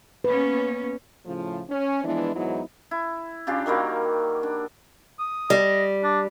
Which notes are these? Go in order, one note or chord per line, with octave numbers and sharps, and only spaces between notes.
A#3 B3 C#4 B4
A2 C#3 F3
C#4
E3 F3 G#3 B3 D4 E4
G#2 E3 F#3 B3 D#4 E4
E4
C#3 D4 F4 G4
D#3 F#3 G3 A#3
D4
D#6
G3 D#5
D4